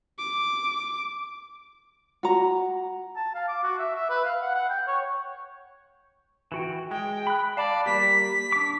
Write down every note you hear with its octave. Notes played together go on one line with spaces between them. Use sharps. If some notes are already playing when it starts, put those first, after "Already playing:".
D6
F#4 A#5
A5
F5
D6
F#4
E5
E5
B4
F5
F#5
F#5
G5
C#5
E3 F#4 G5
G#3 G5
B5 F#6
D5 F5 A5 B5
G3 A#3 G4 B6
D4 D6